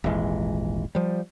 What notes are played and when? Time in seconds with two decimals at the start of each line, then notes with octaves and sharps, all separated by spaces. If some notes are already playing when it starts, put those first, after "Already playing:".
0.04 D#1 G#1 E3 G#3
0.95 F3 G3